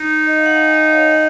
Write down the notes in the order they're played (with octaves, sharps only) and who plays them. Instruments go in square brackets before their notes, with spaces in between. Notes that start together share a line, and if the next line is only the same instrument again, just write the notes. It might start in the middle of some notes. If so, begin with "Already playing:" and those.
Already playing: [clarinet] D#4
[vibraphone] D#5
F5
F#5
F5 G#5
D#5 F#5
C#5 F5
D#5 F#5